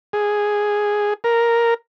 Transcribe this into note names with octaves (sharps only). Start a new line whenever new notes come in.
G#4
A#4